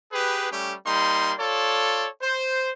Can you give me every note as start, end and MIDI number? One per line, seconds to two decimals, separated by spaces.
0.13 0.48 67
0.13 0.48 68
0.13 0.48 71
0.51 0.75 55
0.51 0.75 57
0.51 0.75 61
0.51 0.75 67
0.87 1.33 55
0.87 1.33 58
0.87 1.33 63
0.87 1.33 84
1.40 2.08 65
1.40 2.08 69
1.40 2.08 73
1.40 2.08 74
2.22 2.72 72